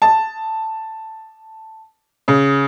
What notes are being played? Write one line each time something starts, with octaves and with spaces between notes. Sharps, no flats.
A5
C#3